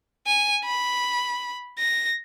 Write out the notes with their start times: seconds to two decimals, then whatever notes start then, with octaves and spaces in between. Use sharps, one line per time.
0.27 G#5
0.64 B5
1.79 A#6